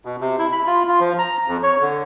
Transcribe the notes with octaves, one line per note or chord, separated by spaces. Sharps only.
B2
C3
E4
B5
F4
F4
F3
A#5
F2
C#5
D3